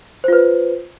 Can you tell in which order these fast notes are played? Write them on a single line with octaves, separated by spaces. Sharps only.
C5 F4 B4